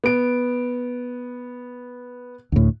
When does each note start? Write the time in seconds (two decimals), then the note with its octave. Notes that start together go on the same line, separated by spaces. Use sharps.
0.04 B3 D7
2.52 D2 A2